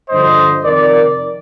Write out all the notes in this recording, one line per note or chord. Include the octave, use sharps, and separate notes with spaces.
G2 D3 F3 C5 D#5
F2 C3 D#3 A#4 D5